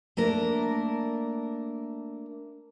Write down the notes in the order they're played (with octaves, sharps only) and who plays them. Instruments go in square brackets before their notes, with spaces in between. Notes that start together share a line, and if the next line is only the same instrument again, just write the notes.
[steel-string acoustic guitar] A3 A#3 D4 A#4